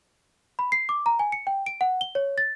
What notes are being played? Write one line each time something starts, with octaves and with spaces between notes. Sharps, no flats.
B5
C7
D6
A#5
G#5
C#7
G5
D7
F#5
G7
C#5
A6